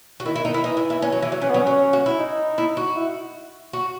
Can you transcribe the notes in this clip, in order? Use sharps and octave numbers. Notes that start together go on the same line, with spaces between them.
F#4
D#3 E4
E4
D#3 D#4
E4
E3 D#4
E4
E4
C#4
F#3
E3
F#3
E3 C#4
B3
F#3
C#4
F#3
F#4
E4
D#4
E4
F#4
E4
F#4